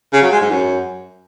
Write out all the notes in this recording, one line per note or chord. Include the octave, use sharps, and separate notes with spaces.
C#3
F#3
G#3
G#2
F#2